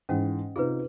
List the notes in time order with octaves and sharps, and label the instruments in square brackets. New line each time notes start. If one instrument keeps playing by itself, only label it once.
[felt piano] G#2 E3 [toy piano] C#4 F#5
[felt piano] C3 D#4 F4 [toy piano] G#4 B4